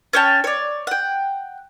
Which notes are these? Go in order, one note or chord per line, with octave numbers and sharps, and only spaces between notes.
C#4 C#5 G5 A5
C#5 D5
F#5 G5